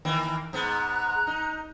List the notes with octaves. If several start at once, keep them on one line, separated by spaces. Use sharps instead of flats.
D#3 E3 A#3
G#2 B3 A#5 F#6
D#4